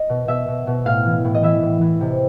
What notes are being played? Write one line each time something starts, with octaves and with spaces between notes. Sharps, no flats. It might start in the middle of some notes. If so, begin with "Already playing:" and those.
Already playing: D#5
B2
B2 E5
B2
B2
A2 F5
E3
A2
D#5
E3 E5
A2
E3
C3